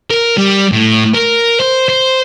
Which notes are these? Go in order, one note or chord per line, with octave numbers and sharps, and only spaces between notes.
A#4
G3
A2
A#4
C5
C5